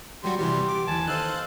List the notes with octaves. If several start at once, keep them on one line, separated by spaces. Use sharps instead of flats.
F#3 G3 F#4 G4 C6
C3 E3 G3
D6
D#2 E3 G#5 A5
D#4 A4 C5 F5 F#6